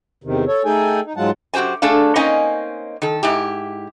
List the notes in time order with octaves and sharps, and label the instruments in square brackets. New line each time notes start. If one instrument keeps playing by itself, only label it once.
[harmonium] E2 C3 D#3
A4 C#5
A3 D#4 G#4 A4 G5 G#5
D#4
G#2 F#3 G#3 F4 F#5 A5
[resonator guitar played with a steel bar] F#2 F#4 G4 C5 G#5
A3 D4 G#4 A4 F5
A#3 C4 C#4 D#4 D#5 G#5
D#3 A4
G#2 E4 G4